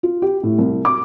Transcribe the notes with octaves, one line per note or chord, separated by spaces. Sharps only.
F4
G4
A2
C2
D6